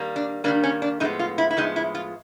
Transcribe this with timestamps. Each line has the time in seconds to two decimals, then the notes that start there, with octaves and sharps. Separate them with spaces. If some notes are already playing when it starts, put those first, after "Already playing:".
Already playing: D#3 G3 A#3
0.16 D4
0.44 D#3 G3 A#3 D4
0.63 C#4
0.82 D4
1.00 A2 F3 G#3 B3 D#4
1.19 F4
1.38 E4
1.51 E4
1.57 A2 F3 G#3 B3 D#4
1.76 E4
1.95 F4